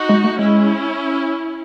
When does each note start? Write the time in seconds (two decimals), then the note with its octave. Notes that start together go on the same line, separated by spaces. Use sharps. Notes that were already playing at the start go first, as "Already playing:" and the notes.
Already playing: D#4 F#4
0.09 G#3
0.24 A3
0.39 G#3 C#4 E4